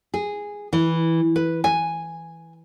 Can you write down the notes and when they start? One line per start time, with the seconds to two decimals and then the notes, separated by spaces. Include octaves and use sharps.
0.14 G#4
0.73 E3
1.36 B4
1.64 G#5